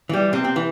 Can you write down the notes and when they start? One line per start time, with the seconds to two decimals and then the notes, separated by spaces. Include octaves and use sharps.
0.09 E3 G3
0.33 C3 C4
0.44 C4
0.56 E3